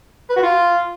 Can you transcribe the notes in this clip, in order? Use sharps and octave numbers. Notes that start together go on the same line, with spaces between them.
B4
F#4
F4